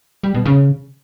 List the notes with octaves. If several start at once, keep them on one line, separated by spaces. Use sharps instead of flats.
G3
B2
C#3